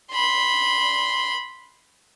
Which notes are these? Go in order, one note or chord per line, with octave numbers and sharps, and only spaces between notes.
B5 C6